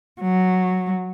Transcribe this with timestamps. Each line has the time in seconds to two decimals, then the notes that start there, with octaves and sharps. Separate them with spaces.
0.22 F#3